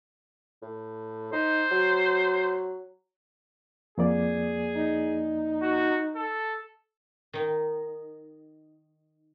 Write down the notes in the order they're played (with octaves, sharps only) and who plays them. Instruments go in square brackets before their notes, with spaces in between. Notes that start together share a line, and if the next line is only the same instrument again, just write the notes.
[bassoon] A2
[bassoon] D#4 [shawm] C5
[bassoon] F#3
[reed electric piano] F2 A#3 D5 [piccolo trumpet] G#4
[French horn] D#4
[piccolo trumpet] F#4
A4
[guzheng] D#3 D#4